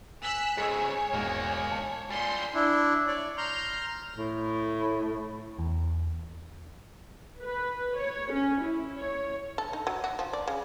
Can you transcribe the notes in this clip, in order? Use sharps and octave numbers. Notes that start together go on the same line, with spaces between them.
G#5 E6 F#6 B6 F7 G7
G#2 C#3 G#4 C#5 D#5 E6
E1 G#2 D#3 A#3
A5
A#2 G3 G#5 C6
D4 E4
C#5 D5
A#5 C6 F6 G6
A2
E2
B4
C#5
C#4
E4
C#5
A4
D#4
F#3
F#4
F3
D5
C#3